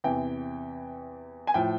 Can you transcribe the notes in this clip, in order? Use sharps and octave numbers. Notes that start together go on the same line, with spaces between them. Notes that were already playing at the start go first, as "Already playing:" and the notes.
E2 C3 E3 G5
G#5
A2 F3 G5